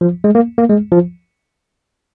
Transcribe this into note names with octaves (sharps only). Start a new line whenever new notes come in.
F3
G#3
A#3
A#3
G#3
F3